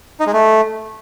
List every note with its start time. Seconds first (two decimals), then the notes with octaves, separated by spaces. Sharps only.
0.20 D#4
0.27 G#3
0.33 A3